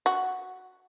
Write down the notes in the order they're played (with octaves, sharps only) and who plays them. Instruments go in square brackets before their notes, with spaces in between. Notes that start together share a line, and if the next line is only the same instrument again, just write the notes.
[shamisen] F#4